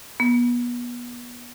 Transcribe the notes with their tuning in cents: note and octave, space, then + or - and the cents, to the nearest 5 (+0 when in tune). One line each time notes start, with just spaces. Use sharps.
B3 -30